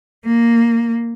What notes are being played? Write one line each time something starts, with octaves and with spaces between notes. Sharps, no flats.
A#3